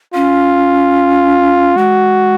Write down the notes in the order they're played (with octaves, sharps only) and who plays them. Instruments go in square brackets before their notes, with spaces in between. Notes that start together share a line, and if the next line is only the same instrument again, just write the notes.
[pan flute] C#4 [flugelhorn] F4
[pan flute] G#3 [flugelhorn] F#4